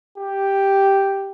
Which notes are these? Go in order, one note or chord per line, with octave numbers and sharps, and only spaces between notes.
G4